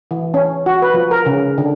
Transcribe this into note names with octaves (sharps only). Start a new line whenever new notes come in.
E3
C#4
F#4
B4
F3
A#4
C#3
D3